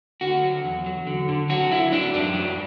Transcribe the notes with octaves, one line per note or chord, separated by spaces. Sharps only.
D3 F#4
F#3
E2
F#3
D3
D3
F#3 F#4
F#3 E4
F#3 D4
F#2 D4
F#3